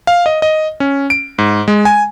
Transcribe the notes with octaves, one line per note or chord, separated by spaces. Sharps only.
F5
D#5
D#5
C#4
D7
G#2
G#3
G#5